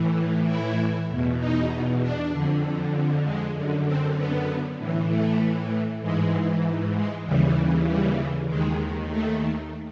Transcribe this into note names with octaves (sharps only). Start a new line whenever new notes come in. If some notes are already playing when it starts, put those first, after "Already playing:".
Already playing: A2 E3
E4
E2 B2
D#4
D4
F2 D3
G#3
F#2 D3
C4
B3
A2 E3
A3
G#2 E3 G#3
G#3
D#2 C#3 E3 G3
G3
D#2 D#3 G#3
A3